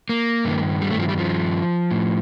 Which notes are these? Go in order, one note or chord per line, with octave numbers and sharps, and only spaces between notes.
A#3
G2 D#3
G3
A3
F3
G3
F3
A2